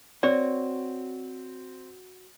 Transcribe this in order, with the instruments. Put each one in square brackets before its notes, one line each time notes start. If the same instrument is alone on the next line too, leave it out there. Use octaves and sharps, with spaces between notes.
[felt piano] C4 [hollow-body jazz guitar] F#4 C#5 [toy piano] D5